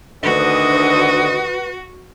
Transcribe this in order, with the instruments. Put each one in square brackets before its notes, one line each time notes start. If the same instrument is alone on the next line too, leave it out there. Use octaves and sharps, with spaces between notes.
[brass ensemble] D2 D#3 D#5 [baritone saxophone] D3 [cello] F#4 [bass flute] B4